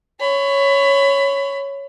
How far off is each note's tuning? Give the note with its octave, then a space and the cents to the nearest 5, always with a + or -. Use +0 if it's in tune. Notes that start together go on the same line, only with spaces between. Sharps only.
C#5 +0 B5 +25